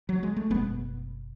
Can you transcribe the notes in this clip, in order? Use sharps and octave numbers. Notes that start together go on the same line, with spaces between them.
F#3
G#3
A3
F#1 E2 B2 G#3 B3